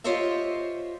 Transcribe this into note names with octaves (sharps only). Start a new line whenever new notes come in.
F4 G4 C5 C#5 D#5 E5